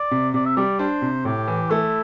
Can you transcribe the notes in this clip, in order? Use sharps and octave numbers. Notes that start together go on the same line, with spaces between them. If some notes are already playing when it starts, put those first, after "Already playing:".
Already playing: D5
C3
C3 D5
E5
G3 D5
D4 C5
C3
A2 G4
E3
A3 E4